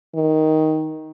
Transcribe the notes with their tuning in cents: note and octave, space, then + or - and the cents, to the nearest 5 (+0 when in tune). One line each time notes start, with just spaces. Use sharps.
D#3 +10